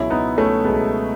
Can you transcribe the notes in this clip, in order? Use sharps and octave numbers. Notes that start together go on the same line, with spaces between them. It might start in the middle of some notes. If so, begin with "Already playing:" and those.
Already playing: C#2 B2 F#3 C#4 E4
B3 D#4
A3 C#4
C#2 B2 F#3 G#3 B3